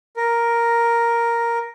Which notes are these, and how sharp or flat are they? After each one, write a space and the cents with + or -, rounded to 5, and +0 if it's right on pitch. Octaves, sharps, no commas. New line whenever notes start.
A#4 +5